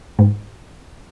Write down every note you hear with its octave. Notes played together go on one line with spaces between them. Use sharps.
G#2